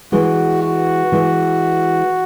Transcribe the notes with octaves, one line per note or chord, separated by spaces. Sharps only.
E3 G#3 F#4
F#4
E3 G#3